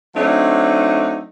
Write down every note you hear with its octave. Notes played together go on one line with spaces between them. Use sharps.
F#3 A3 C4 D4 D#4